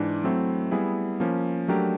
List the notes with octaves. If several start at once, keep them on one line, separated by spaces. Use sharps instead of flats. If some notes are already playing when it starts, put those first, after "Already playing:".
Already playing: G#2 E3 D4
F#3 A3 C4 E4
G3 B3 E4 G#4
F3 A#3 C#4
F#3 A3 D4 G4 A#4